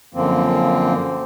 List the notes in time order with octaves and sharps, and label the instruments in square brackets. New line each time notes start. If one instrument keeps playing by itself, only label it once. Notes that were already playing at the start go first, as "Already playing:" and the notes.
[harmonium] F#2 D3 F3 A#3 C4